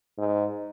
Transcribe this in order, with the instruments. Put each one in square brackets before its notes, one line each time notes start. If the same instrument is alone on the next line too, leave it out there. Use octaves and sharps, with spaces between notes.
[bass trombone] G#2